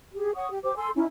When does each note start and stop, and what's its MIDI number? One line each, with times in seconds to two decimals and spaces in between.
0.13 0.32 67
0.13 0.32 68
0.35 0.47 73
0.35 0.47 78
0.35 0.47 85
0.35 0.47 87
0.49 0.59 67
0.64 0.75 67
0.64 0.75 72
0.64 0.75 86
0.76 0.89 69
0.76 0.89 80
0.76 0.89 84
0.76 0.89 88
0.95 1.05 61
0.95 1.05 63
0.95 1.05 64